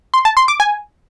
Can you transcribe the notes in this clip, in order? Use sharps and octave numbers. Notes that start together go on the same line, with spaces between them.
C6
A5
C6
D6
G#5